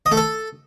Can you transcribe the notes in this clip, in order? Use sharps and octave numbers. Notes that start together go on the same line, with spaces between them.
D#5
A3
A4